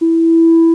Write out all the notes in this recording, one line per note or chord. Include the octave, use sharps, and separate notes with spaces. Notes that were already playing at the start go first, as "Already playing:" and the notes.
E4